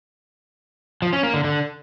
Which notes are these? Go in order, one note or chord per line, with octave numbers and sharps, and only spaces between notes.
F3
C#4
A#3
D3
D3